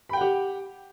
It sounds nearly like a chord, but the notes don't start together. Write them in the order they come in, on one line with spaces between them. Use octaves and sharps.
B5 G5 F#5 G4